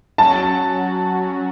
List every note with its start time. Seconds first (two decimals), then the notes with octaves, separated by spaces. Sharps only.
0.18 F#3 C#4 F#4 A5